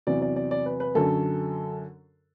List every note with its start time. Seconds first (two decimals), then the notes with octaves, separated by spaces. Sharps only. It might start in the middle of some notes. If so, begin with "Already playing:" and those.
0.07 E2 C3 F#3 D5
0.22 D5
0.36 D5
0.51 D5
0.66 B4
0.80 B4
0.95 F#2 D3 F#3 A4